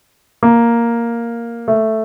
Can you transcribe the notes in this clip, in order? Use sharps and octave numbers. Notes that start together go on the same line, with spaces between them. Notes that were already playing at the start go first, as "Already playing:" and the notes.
A#3
A3